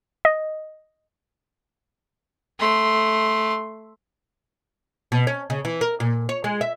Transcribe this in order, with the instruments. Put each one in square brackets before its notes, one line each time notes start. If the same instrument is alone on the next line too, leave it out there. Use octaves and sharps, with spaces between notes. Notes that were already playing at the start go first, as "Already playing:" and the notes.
[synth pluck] D#5
[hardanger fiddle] A3 C6
[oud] B2
C#4
C#3
E3
A#4
A#2
C#5
G#3
E5